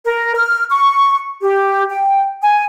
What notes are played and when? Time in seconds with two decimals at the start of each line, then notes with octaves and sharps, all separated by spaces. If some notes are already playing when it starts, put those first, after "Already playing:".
0.04 A#4
0.35 F6
0.70 C#6
1.41 G4
1.89 G5
2.41 G#5